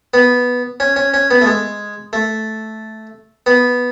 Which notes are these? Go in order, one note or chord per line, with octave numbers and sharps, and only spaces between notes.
B3
C#4
C#4
C#4
B3
A3
G#3
A3
B3